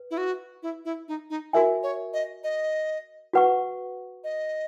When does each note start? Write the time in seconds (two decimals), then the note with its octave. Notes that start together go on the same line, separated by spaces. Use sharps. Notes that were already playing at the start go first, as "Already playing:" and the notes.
Already playing: B4
0.11 E4
0.18 F#4
0.63 E4
0.85 E4
1.08 D#4
1.30 D#4
1.53 E4 F#4 A#4 E5 G#5
1.83 C#5
2.13 D#5
2.44 D#5
3.33 F#4 B4 F#5 C#6
4.24 D#5